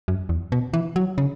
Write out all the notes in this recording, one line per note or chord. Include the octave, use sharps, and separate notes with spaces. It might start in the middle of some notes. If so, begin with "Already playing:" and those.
F#2
E2
B2
E3
F#3
C#3